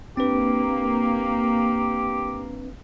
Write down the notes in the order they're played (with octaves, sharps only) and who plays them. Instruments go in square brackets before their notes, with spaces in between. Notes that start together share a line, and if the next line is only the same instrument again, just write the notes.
[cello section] A#3 [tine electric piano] C4 D4 B4 [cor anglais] G4